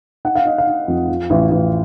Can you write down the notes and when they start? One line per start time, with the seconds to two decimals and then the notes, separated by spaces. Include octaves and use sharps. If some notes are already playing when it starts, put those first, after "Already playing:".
0.25 D#4 F#5
0.35 F5
0.45 D#4 D#5
0.58 F5
0.67 D#4
0.88 F2
1.08 F3
1.30 A1
1.51 A1